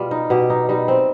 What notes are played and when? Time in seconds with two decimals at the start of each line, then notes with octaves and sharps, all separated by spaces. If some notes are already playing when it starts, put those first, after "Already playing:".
Already playing: B2 G3 F4
0.11 D#4
0.30 B2 G4
0.50 D#4
0.69 G3 D#4
0.88 C4